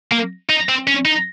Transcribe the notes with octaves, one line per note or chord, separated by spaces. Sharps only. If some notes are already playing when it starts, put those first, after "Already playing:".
A#3
D#4
C4
C#4
D#4